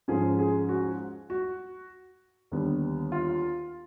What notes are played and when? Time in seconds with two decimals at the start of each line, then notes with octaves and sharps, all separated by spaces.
0.08 G#2 F3 G#3 C#4 G#4
0.39 G#4
0.69 F#4
1.30 F#4
2.52 D#2 D3 G3 B3
3.12 F4